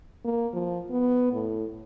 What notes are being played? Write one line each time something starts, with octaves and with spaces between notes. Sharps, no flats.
A#3
F3
B3
A2